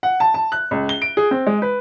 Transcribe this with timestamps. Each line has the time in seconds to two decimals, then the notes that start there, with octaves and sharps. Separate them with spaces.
0.03 F#5
0.20 A5
0.34 A5
0.52 F#6
0.71 C#2
0.89 G7
1.02 D7
1.17 G#4
1.31 C4
1.47 G#3
1.62 B4